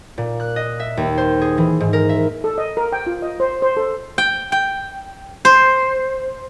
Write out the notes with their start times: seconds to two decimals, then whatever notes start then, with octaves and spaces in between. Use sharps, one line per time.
0.18 A#2
0.40 F#6
0.56 D#5
0.80 E5
0.97 D#2
1.18 C5
1.41 G#4
1.58 E3
1.80 G#2
1.93 A#4
2.09 E5
2.44 A4
2.58 D#5
2.77 A#4
2.92 G5
3.07 F4
3.22 D#5
3.40 C5
3.62 C5
3.77 A4
4.18 G5
4.52 G5
5.45 C5